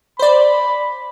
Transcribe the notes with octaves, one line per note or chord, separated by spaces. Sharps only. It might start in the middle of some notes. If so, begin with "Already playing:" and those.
C5 D5 B5